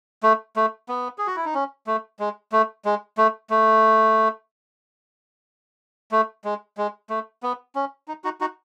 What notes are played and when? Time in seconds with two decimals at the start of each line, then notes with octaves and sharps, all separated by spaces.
0.23 A3
0.56 A3
0.89 B3
1.18 G#4
1.27 F#4
1.36 E4
1.45 D#4
1.54 C#4
1.87 A3
2.19 G#3
2.52 A3
2.85 G#3
3.18 A3
3.50 A3
6.12 A3
6.44 G#3
6.77 G#3
7.10 A3
7.43 B3
7.75 C#4
8.08 D#4
8.24 D#4 F#4
8.41 D#4 F#4